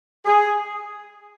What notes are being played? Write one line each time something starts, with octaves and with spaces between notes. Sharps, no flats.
G#4